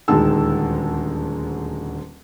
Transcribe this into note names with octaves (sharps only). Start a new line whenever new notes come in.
D#1 D2 G#3 D#4 A5 E6